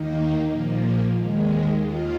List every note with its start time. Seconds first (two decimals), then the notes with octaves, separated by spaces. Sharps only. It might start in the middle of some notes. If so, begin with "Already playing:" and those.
Already playing: D#2 D#3 A#3 D#4
0.47 A#2 F3 A#3
1.13 D#2 D#3 G#3
1.78 D#2 D#3 A#3 F4